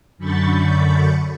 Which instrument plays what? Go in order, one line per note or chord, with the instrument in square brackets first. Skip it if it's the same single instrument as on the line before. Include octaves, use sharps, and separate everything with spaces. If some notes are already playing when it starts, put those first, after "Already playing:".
[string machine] F#2 D3 B5 C#6 G6 A6